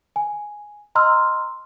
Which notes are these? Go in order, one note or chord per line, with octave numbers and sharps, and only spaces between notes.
G#5
D#5 A#5 C6 E6 F6